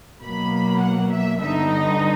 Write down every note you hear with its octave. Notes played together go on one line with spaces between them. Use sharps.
B2 F#3 A#3 B5
F#5
E5
G2 D3 G3 B3 D#4 E5
D#5